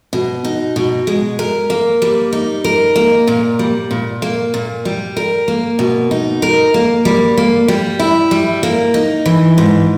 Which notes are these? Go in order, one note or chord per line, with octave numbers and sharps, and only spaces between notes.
B2
D#4
B2
G#3
A#4
A#3
G3
D#4
A#4
A#3
A#2
G3
A#2
A#3
A#2
G3
A#4
A#3
B2
D#4
A#4
A#3
G3
A#3
G3
E4
G3
A#3
D#4
E3
G#2